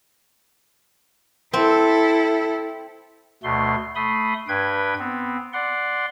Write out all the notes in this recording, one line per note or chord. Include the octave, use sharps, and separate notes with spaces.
C4 E4 A4
D2 B2 A3 C6
A3 B5 C6 D#6
G2 B4 G5 G#6
B3 C4
D5 F#5 C6